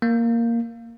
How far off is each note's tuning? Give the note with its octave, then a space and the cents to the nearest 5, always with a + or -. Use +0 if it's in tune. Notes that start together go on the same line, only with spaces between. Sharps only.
A#3 -5